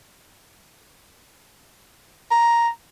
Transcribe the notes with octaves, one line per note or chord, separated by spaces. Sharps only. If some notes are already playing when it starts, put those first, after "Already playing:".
A#5